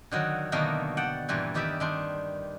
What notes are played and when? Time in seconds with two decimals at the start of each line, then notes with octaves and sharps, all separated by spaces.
0.11 D3 D#3 F#3
0.52 B2 D3 D#3 A3 A#3
0.97 D5 F#5 G5 A5
1.29 G2 A#2 E3 G3
1.54 E2 D#3 G4 D5 E5
1.80 D#3 D4 C6